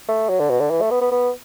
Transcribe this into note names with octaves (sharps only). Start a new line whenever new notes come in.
A3
F#3
D3
B2
D3
E3
A3
B3
B3
B3